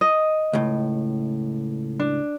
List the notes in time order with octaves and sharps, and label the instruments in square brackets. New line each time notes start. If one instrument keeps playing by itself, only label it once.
[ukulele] D#5
[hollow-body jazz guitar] C#2 A2
[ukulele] D4